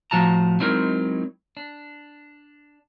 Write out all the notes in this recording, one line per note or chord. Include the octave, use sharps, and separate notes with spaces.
A2 F3 F#4 A5 A#5
F#3 G#3 C4 D#4 E4 A#4
D4